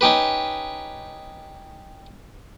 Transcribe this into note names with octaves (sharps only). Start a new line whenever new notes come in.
C#4 D#4 G4 B4